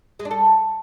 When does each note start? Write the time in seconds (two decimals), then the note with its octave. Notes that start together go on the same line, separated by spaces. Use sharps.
0.19 G#3
0.25 D4
0.31 A4